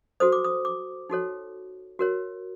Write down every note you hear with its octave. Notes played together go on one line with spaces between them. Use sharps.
F#4 A4 C5 D#6
D6
D#6
D6
D#4 F#4 A4 C#5
F#4 A#4 C#5